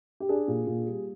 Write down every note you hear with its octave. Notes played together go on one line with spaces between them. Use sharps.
G4
D4 G#4
A#2
A#2
G3